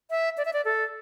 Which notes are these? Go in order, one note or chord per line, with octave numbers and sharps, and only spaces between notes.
E5
D5
E5
D5
A4